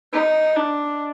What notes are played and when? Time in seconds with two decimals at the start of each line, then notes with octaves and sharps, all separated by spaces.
0.13 D#4
0.56 D4